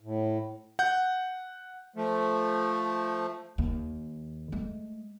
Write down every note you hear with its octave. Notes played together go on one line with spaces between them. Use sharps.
A2
F#5 G6
F3 A3
D#2
G#3 A3